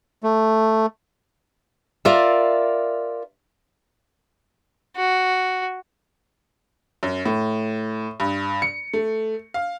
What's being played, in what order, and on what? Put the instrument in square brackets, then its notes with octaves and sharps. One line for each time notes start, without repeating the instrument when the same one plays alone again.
[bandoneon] A3
[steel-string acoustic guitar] F4 A#4 D5 E5
[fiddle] F#4
[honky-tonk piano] F#2
A2
G2
C#7
A3
F5